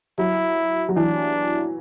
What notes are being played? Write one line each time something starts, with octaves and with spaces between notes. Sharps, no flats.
F#3 E4
F#3
E3 D4